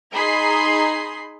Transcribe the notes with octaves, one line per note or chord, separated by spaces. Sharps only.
D#4 G#4 B5 C6 C7